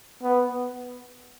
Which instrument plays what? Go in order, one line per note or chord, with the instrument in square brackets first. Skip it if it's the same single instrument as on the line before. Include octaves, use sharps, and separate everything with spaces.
[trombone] B3